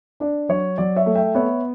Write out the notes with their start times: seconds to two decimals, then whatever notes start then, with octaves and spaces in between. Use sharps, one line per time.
0.20 D4 D5
0.49 F#3 C#5
0.78 F#3 D5
0.96 C#5 E5
1.06 A3
1.15 E5 G5
1.35 B3 C#5 E5